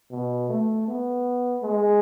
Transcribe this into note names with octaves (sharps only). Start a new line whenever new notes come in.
B2
A3
B3
G#3